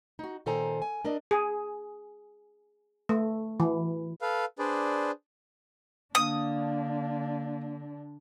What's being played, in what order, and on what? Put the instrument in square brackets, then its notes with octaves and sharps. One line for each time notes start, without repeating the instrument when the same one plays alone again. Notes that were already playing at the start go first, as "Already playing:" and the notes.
[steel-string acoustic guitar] D#4 F#4
A#2 D#3 A4 C5 G#5 A#5
G#5
D4 A#4 D5 D#5
[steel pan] G#4
A3
E3
[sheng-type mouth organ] A4 B4 F5
D4 G#4 B4 C5 D5
[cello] D3 D4 [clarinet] A#3 [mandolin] D#6